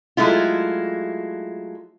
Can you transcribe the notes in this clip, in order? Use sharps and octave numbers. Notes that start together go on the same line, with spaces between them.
F#3 G#3 A3 E4 F4